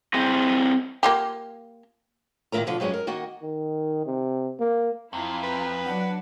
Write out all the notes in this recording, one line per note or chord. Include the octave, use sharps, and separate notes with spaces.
C4 E4 G#4 D#5
A#3 F4 G4
A#2 D#3 C#4 E4 A#4 A#5
B2 D3 F3
G2 F#3 G#3 B3 C#4
A#4
D#3 A#3 F#4 D#5 F#5
D#3
C3
A#3
F2 E4 F4 A#5
B4
F#3 D4 F#5